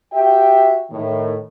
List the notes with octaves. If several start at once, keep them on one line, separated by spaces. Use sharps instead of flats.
F#4 G4 E5 G5
A2 D#3